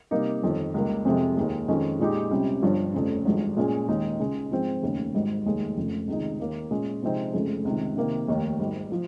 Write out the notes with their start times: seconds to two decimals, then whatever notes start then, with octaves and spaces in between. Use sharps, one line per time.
0.11 C3 G3 A#3 D#4 G4
0.43 G1 F2 D#3
0.74 C#2 C#3 G3 A#3
1.05 F2 C3 F3 G#3
1.37 D#2 D#3 G#3
1.68 F2 D#3 G#3 C#4
1.99 A#2 G#3 D#4 G4
2.31 C#2 C3 G3 C#4 G4
2.62 G1 G2 F3
2.93 F1 F2 C#3
3.25 G#1 G2 F3 G#3
3.57 A#2 G#3 C#4 G#4
3.88 D#2 D#3 G#3 D#4 G#4
4.19 C#2 C#3 G#3
4.51 G#2 F3 G#3 C4
4.82 F1 D#2 C#3
5.14 G#1 G#2 G3
5.45 F1 D#2 D#3 G#3
5.76 F1 F2 C#3
6.08 C#2 C3 D#3 G#3 D#4
6.40 D#2 D#3 A#3
6.71 A#2 G#3 C#4
7.02 C3 F3 G#3 C4 D#4
7.33 F1 F2 C#3 G#3
7.65 C#2 C3 D#3
7.97 C3 D#3 A#3
8.28 F1 D#2 D#3
8.59 G#1 G#2 G3
8.92 F3